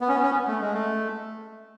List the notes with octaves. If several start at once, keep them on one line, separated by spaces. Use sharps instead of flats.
B3
C#4
B3
C#4
B3
A3
G#3
A3